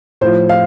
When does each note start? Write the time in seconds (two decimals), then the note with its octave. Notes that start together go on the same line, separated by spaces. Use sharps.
0.21 A2 C5
0.25 F3
0.49 F5